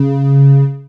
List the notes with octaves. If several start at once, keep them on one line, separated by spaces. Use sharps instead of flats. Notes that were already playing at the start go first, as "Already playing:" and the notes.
Already playing: C#3